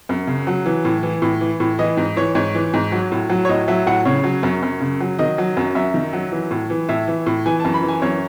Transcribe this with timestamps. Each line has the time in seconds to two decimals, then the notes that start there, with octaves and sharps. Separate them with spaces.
0.09 F#2
0.27 C#3
0.47 F#3
0.66 E3
0.85 A2
1.03 E3
1.22 A2
1.41 E3
1.60 A2
1.79 E3 D#5
1.97 G#2 D#5
2.16 E3 C#5
2.35 G#2 C#5
2.55 E3
2.74 G#2
2.92 F#3
3.12 A2
3.30 F#3
3.45 C#5
3.49 A2 D#5
3.68 F#3 E5
3.86 A2 F#5
4.05 C#3 C#5
4.24 F#3
4.43 F#2
4.62 F#2
4.81 C#3
5.01 F#3
5.19 D#3 D#5
5.38 F#3
5.57 F#2
5.75 F#2 E5
5.94 D#3
6.13 F#3
6.32 E3
6.51 A2
6.70 E3
6.89 A2 E5
7.08 E3
7.26 A2
7.46 E3 G#5
7.60 F#2 A5
7.74 B5
7.83 E3
7.88 G#5
8.02 F#2 C#5